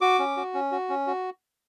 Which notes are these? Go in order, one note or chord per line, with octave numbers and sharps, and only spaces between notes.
F#4 D6
C#4
F#4
C#4
F#4
C#4
F#4